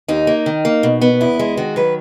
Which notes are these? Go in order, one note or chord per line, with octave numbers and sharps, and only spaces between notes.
D#2 D#4
A#3
D#3
A#3
B2
B3
E2 E4
G#3
D#3 F#4
F#3 B4